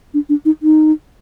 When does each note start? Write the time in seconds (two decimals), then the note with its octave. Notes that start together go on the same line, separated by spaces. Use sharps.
0.14 D4
0.29 D4
0.45 D#4
0.63 D#4